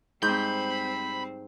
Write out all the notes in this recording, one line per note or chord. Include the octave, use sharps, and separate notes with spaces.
G#2 G3 C4 B5 G6